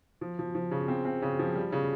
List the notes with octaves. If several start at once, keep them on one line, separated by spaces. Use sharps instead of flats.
F3
F3
F3
C#3
C4
C4
C#3
F3
G3
C#3